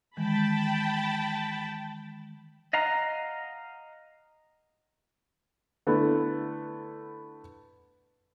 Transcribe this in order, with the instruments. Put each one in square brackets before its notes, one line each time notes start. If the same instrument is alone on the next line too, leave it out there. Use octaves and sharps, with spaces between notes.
[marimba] D#3 E3 G#3 [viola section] G5 A5 B5
[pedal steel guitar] D#5 F5 F#5 A#5
[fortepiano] D3 A3 B3 E4